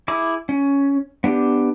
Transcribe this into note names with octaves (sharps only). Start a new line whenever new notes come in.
E4 G#4 D6
C#4
B3 D4 G4